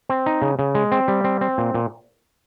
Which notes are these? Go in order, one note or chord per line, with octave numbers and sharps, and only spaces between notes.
C4
D#4
C#3
C#3
G#3
C4
G3
C4
C4
A#2
A#2